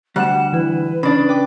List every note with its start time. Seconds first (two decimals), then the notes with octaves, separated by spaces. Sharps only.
0.16 D2 G3 F#5 F#6 E7
0.53 E3 E4 B4
1.03 C#3 D4 B5
1.29 B4 G5 D6